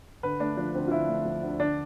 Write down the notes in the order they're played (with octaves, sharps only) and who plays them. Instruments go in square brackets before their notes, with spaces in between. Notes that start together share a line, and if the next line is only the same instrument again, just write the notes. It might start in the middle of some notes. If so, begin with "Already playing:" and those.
[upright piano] D3 B4
A3 D4
F3 D4
D2 C4
F4
D3 E4
A3
F3
D2
D3 D4